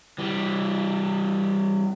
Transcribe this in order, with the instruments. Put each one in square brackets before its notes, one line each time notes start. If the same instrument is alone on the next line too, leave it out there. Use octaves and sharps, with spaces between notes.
[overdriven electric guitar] E3 G3